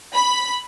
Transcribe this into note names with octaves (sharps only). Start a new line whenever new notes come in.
B5